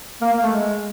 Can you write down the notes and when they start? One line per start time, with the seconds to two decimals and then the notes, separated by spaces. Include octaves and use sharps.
0.21 A#3
0.32 A#3
0.42 A3
0.53 G#3